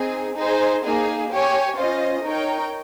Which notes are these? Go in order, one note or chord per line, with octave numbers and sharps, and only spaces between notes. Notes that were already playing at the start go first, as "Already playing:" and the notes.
Already playing: C4 D#4 G#4
D#4 G#4 C5
A#3 D#4 G#4
G4 C#5 G#5
C#4 F4 C5 D#5
D#4 A#4 C#5 G5